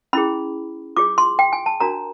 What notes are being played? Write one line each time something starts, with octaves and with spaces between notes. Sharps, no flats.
C#4 E4 G#4 B5
F4 G#4 C#5 D6
C6
G5
G#5
A5
D4 F#4 A#4 C#5 A#5